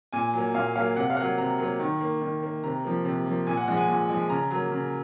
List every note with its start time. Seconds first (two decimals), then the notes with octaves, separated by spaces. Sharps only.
0.13 A#2 G#5
0.34 F#3 A#3
0.54 A#2 F5
0.76 F#3 A#3 F5
0.96 C3 F#5
1.10 F5
1.17 F#3 A#3 F#5
1.38 C3 A#5
1.59 F#3 A#3
1.80 D#3
2.01 A#3
2.22 D#3
2.43 A#3
2.63 C3 A#5
2.84 F3 A#3
3.05 C3
3.26 F3 A#3
3.47 A#2 G#5
3.57 F#5
3.68 F3 G#3 F#5
3.77 G#5
3.88 A#2
4.09 F3 G#3
4.30 C#3 A#5
4.51 F#3 A#3
4.72 C#3